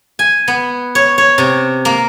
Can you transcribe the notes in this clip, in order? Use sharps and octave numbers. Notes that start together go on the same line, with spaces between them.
G#5
B3
C#5
C#5
C3
A#3